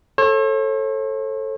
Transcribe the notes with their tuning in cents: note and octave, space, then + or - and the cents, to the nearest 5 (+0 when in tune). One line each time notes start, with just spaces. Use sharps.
A4 +0 C#5 -45